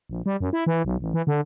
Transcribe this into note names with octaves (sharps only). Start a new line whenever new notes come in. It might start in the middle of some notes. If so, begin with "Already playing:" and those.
A#1
G3
F#2
E4
E3
B1
A1
E3
D3